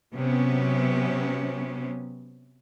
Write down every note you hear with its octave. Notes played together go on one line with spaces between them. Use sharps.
C3 F#3 B3 C#4